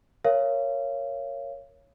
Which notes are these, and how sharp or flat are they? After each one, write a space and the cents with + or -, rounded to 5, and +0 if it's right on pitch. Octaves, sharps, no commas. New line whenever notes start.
A#4 +0 C#5 +0 F5 -35